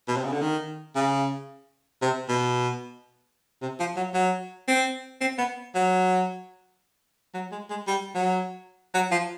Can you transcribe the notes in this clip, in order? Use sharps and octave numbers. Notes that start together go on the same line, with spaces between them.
B2
C3
C#3
D3
D#3
C#3
C3
B2
C3
F3
F#3
F#3
C4
C4
B3
F#3
F#3
G#3
G#3
G3
F#3
F#3
F3